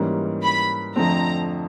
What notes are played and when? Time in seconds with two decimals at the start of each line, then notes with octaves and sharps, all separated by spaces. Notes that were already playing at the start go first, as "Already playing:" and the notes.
Already playing: G#2 E3 G3 A#3 C#4
0.43 B5
0.96 F2 D3 F3 A3 C4 A#5